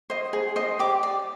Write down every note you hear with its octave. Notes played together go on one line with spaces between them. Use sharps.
C5 D#5
G#4
C5 D#5
G4 D6
D5